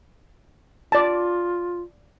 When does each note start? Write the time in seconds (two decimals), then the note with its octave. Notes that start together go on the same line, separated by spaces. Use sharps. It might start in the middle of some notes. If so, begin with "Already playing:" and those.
0.92 F4 D5 A5